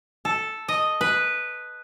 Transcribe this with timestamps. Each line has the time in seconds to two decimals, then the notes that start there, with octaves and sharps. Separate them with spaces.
0.25 A4
0.68 D#5
1.01 B4